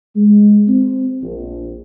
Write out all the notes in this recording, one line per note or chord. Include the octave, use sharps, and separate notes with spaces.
G#3
C4
A#1